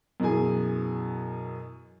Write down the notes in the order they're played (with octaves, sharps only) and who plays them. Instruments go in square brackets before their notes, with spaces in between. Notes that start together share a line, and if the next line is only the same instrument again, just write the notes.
[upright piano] F#2 B2 E3 G#4 G#5